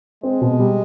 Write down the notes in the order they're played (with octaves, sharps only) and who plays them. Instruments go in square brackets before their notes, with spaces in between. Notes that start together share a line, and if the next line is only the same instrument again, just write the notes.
[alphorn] G#3 [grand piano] C4
[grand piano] B2
G3